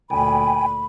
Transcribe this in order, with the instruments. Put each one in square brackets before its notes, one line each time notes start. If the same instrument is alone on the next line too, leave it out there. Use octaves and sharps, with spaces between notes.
[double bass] D2 A#2 [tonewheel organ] G5 G#5 [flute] B5